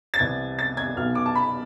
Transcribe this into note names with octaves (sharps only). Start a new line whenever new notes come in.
A6
C2 C3 E3 G#6
A6
G#6
B1 B2 F6
D6
A5
B5